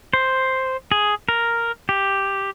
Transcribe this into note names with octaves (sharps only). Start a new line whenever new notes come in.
C5
G#4
A#4
G4